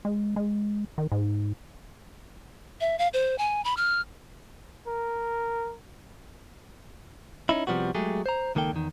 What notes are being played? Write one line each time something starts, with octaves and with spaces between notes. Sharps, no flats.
G#3
G#3
D#3
G#2
E5
F5
C5
G#5
B5
F6
A#4
C#4 D#4 E4
C3 F3 G3 B3 F#4
F#3 G#3 A3 G4 G#4
C5 A#5
C#2 D#3 A#3 A4 G5
E2 D#3